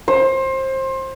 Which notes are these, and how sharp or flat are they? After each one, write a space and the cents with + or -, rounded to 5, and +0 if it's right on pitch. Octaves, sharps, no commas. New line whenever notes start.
C5 +25